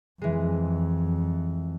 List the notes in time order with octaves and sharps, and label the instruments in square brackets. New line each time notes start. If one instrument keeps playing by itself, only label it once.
[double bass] F2 [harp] E3 G#3